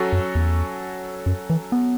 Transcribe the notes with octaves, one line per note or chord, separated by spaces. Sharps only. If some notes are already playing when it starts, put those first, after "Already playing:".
Already playing: F#3 C#4 F#4 A4 C#5
F#2
E2
F#2
E3
B3